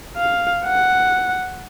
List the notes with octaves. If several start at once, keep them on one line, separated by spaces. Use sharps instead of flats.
F5
F#5